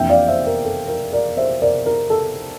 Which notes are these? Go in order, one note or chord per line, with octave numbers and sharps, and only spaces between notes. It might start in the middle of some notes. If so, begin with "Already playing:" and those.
Already playing: F2 E3 A#3 D4 E5 G5
D5 F5
C5 E5
A#4
A4
A#4
A#4 D5
C5 E5
A#4 D5
A#4
A4